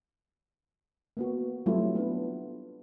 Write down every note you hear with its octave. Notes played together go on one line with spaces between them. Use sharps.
A#3 B3 F#4
F#3 G3 A3 C4 E4 F4
B3 D4